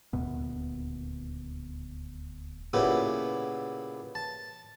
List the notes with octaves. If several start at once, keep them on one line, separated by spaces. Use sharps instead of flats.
D#1 D2 A#2 B3
A#2 C#3 B3 E4 G4
A5